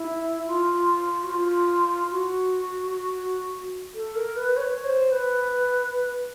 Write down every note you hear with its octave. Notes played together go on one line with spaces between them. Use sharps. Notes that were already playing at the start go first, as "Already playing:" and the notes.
Already playing: E4
F4
F#4
F4
F#4
A4
A#4
B4
C#5
C5
B4